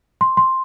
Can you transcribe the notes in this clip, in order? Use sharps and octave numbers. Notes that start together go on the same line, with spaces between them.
C6
C6